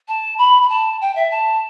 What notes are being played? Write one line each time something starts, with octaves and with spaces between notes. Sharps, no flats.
A5
B5
B5
A5
G5
E5
A5